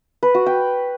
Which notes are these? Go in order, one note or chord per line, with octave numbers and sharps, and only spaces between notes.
B4
F#4
G5